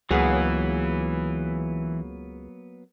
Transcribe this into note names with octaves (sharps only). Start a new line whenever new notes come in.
C#2 E3 F#3 A#3 B3 G#4 F5 F#5